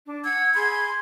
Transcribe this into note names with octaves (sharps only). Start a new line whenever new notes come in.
D4
F#5 E6 G#6
G#4 B5 C6 G#6